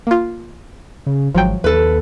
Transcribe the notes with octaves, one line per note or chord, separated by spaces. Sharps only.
A#3 F4
C#3
G#1 F3 F#3 G5
D#2 A4 B4